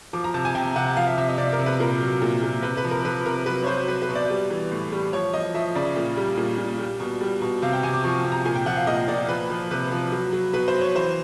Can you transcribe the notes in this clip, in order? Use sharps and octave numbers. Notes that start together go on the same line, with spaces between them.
F3 D6
A#5
C3 A5
G#5
C3 G5
C3 F#5
F3 F5
E5
C3 E5
D#5
C3 D5
A#4
C3
B4
A#2 A#4
F#3
A#2
A#2
C3 B4
B4
F3
A#4
F3 B4
C3 A#4
F#3 B4
C#5
F#3 C5
F#3 B4
B4
B2
D5
G3
E3
A2
G3
F3 C#5
F3 D#5
F3 E5
C#3 D5
A#2
G3
A#2
A#2
G3
B2
G3
B2
C3 F5
G5
C3 G#5
D6
F3 C#6
C3
A#5
A#2 G#5
G5
F3 F#5
F5
A#2 D#5
A#2 D5
F3 B4
F3
C3 B4
F3
F#3
F#3
B2 B4
C5
F#3
C#5
E3 C5